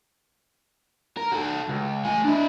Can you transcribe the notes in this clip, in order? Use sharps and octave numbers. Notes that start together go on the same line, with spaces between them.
A#4
F#4 A4
C#2
A3 G#5
D4 E4